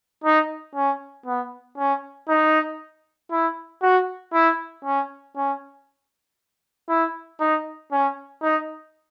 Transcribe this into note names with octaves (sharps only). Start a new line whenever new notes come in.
D#4
C#4
B3
C#4
D#4
E4
F#4
E4
C#4
C#4
E4
D#4
C#4
D#4